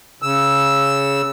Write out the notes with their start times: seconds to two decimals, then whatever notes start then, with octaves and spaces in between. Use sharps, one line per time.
0.22 C#3 E6